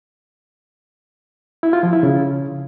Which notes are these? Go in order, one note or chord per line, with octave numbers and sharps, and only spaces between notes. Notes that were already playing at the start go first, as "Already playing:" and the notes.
E4
F4
F3
E4
C#3